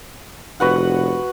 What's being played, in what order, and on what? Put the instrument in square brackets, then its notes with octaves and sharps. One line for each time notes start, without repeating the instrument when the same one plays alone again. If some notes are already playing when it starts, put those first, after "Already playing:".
[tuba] F1 [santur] F#4 B4 F#5